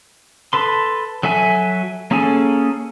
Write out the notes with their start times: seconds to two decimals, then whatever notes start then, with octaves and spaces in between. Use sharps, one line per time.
0.53 A4 B4 C6
1.23 F#3 A4 E5 G#5
2.11 A#3 C#4 G#4 A4 G#5